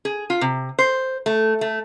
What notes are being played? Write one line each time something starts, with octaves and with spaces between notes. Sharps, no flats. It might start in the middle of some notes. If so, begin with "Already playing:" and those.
G#4
F4
C3
C5
A3
A3